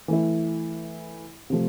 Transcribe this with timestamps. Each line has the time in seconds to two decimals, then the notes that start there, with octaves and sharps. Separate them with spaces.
0.08 E3 A3 E4
1.50 C3 F3 A3